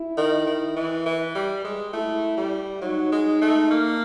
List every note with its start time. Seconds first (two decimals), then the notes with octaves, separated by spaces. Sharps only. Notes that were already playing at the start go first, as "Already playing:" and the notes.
Already playing: E4
0.18 D#3
0.47 D#3
0.77 E3
1.06 E3
1.35 G3
1.65 G#3
1.93 A3 E4
2.38 G3
2.82 F#3 D#4
3.12 G#3
3.42 A3
3.71 A#3